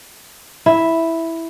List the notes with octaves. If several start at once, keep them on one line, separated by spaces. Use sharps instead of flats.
E4